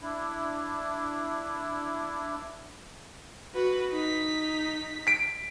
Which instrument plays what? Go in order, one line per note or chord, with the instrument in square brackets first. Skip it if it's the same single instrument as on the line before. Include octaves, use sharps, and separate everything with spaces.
[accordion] D4 E4
[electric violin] F#4 B4
D#4 B6
[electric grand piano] B6 D7